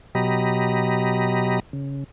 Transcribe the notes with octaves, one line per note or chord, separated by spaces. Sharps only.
B2 F#3 G4 D#5 A#5 B5
C#3